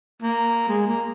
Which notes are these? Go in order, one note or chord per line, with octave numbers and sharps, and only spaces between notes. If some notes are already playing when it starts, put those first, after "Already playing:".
A#3
G#3
A#3